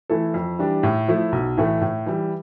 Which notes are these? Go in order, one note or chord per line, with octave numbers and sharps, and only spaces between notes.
E3 A3 E4 A4
F2
E3 G3 D4
A2
F3 A3 E4
B1
A2 E3 A3
A2
E3 G3